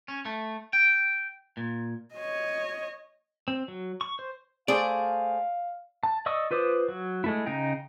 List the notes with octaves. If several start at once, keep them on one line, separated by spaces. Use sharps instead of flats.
C#4
A3
G5
A#2
C#5 D#5
C4
F#3
C#6
C5
A3 G#4 C5 D5 F5
A5
D5 D#5 C#6 D#6 E6
F4 B4 C5 D6 D#6
F#3
G#3 A3 E4
C#3 D#4 D#5 G5 A#5